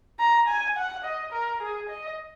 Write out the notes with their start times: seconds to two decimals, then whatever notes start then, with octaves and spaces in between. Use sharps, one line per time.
0.19 A#5
0.48 G#5
0.77 F#5
1.04 D#5
1.33 A#4
1.61 G#4
1.90 D#5